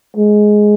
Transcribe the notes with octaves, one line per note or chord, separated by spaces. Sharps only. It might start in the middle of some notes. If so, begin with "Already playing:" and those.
G#3